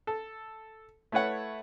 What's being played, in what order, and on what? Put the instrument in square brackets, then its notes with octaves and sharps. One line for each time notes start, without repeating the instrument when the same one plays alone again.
[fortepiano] A4
A3 E4 B4 C#5 F#5